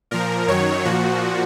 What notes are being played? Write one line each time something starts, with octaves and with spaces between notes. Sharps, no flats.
A#2 F3 A#4
F#2 D#3 F#3 C#5
A#2 F3 F#4